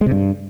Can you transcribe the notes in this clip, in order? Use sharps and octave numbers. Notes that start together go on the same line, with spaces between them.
G#3
C3
G2